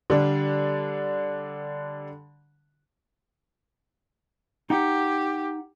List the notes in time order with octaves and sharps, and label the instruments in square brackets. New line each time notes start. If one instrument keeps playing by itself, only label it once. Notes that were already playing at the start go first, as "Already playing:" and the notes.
[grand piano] D3 G3 D4
[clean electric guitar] D#4 F#5 [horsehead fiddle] G4